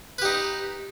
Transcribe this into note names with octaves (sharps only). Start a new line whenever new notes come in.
D#4 G4 B4